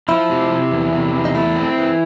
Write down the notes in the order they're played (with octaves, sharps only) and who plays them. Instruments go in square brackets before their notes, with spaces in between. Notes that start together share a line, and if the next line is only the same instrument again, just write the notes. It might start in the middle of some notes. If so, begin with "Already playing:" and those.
[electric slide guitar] F3 [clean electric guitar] E4
[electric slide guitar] C3
C3
E2
C3
E2
[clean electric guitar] D#4
[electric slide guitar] A3 [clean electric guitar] E4
[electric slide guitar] C4
E3